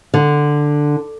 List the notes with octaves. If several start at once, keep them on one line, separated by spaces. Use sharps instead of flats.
D3